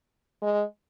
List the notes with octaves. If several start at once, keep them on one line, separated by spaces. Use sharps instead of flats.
G#3